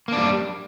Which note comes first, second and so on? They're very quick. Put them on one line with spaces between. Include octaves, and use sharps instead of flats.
A#3 D4 G3